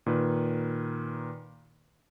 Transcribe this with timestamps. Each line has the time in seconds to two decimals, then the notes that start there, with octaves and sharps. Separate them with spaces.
0.06 A#2 D#3 B4